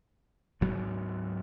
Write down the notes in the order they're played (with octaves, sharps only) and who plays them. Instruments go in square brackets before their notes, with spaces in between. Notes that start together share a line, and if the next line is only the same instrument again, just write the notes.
[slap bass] D2 G#2 F#3 B3